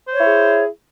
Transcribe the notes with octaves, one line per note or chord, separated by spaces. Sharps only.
E4 G#4 C5 C#5